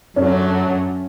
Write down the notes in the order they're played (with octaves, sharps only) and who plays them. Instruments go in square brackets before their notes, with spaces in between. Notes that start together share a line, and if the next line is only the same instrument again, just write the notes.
[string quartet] F#2 D3 F#3 A3 [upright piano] C#4